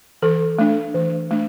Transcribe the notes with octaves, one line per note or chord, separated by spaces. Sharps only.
E3 A4
A3 D4
E3
A3 D4